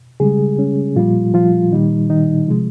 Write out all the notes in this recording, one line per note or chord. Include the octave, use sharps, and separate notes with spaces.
C#3 G3 G#3 G#4
C#4
A#2 F3 G3 F4
F3 F4
A#2 D#3 G3 D#4
D#3 D#4
C3 F3 G#3